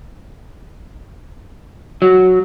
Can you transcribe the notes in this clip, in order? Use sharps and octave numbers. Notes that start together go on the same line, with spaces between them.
F#3